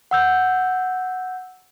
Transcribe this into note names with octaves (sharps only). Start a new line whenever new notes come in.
F#5 E6 G6